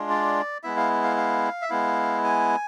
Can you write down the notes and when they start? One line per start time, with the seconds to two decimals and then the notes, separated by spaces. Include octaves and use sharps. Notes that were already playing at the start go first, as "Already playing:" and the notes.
Already playing: G#3 D4 F4
0.10 D5
0.64 G#3 B3 E4 E5
0.77 F5
1.04 F5
1.17 F5
1.62 E5
1.70 G#3 B3 E4 F5
2.24 G#5